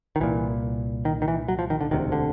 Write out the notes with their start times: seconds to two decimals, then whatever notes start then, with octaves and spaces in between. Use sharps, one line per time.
0.16 D#3
0.20 C2 A#2 E3
1.05 D#3
1.22 D#3
1.28 E3
1.48 F#3
1.59 F3
1.70 D#3
1.81 D3
1.91 E1 D2 C3 D#3
2.12 D3